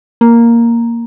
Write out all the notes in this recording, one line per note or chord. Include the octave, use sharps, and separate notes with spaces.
A#3